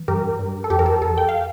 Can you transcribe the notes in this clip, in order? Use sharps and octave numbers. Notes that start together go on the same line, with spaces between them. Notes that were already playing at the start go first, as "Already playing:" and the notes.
Already playing: E3
G2 G4 A#4
G2
A4
F2 G4
A#4
A4
F2 A4
G5
F5